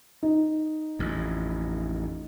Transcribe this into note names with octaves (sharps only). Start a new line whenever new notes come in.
D#4
A1 F2